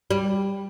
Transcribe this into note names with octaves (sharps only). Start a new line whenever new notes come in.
G3